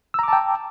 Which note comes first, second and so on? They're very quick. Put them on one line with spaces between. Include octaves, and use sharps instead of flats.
E6 A#5 D6 A5 G5